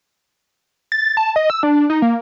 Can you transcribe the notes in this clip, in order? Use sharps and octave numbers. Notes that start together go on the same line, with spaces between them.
A6
A5
D#5
E6
D4
D#4
A#3